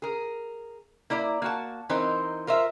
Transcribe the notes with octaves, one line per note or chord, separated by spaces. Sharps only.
G#4 A#4
A#3 E4 D5 A#5
A#3 F#4 A5
E3 C4 D#4 A#4 C5
F4 A#4 C5 E5